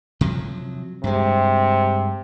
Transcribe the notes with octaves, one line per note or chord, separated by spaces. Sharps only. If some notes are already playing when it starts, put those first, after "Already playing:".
C3 F3 F#3
G2 C3 G#3